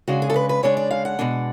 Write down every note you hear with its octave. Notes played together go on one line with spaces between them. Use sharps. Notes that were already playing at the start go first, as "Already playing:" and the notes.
C#3 G#3 D4 F#4
G#4
A4
B4
B4
C#3 G#3 D4 C#5
D5
F5
F#5
B2 G#3 D4